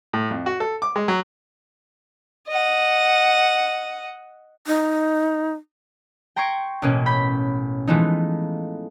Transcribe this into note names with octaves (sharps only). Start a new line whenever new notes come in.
A2
F2
F#4
A4
D6
G#3
F#3
D#5 F#5
D#4
G5 A#5 C6 C#6 G#6 D7
A1 B2 A#3 C#4
B5 G6 B6
E3 F3 G#3 A3 B3 D#4